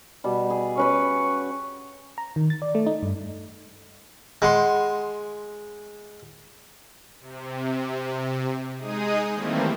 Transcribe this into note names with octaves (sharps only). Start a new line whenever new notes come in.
B2 G3
G#4
C#4 B4 C#5 C#6
A#5
D#3
A6
D5
A3
D#4
G2
G#3 F#5 B5 C6
C3
G#3 D#4 G#4 D#6
D#3 E3 G3 A3 A#3 C4